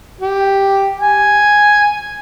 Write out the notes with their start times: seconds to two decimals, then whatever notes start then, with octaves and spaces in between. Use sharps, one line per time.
0.21 G4
1.00 G#5